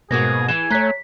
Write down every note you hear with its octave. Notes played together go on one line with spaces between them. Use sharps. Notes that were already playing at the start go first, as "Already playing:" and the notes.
G#2 B2 A#3 F#4 G#4 A#6
E3 G#4 G#5 E7
A3 C5 C#5 A#5 F#6 B6
B6